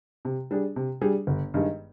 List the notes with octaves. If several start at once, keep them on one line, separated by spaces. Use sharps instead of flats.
C3
G3 D4 G#4
C3
G3 D4 G#4
G1
G2 D#3 G#3